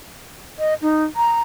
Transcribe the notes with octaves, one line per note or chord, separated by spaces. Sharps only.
D#5
D#4
A#5